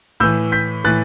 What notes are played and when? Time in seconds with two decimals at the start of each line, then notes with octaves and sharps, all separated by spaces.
0.20 A2 E3 E6 G6
0.52 G6 B6
0.84 A2 E3 F#6 A6